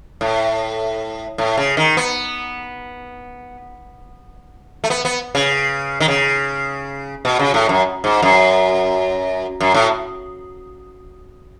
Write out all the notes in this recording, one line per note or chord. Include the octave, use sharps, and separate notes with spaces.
A2
A2
C#3
D#3
B3
A3
B3
B3
C#3
D#3
C#3
B2
C#3
A2
F#2
G#2
F#2
F#2
A2